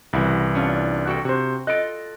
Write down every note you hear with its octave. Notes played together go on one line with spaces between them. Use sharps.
C2 C#3 E3 E4 F#4
C#4 D4 F4
F#4 A4 G5
C3 F#4 C5
F4 A4 D#5 F#6 D7